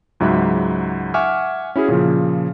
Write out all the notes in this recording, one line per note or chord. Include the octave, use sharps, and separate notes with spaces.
C#2 G#2 F#3 E5 B5 F#6
E5 F#5 G#5 C#6 D6 F6
C#4 E4 F#4 G#4
A#2 C#3 F3